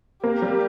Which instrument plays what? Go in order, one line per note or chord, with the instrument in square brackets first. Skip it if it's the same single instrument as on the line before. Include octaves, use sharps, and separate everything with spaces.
[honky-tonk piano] A#3 [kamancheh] G4
[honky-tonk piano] G3